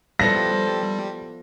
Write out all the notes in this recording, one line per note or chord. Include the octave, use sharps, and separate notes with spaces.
F3 G3 B3 E4 A4 C5 A#6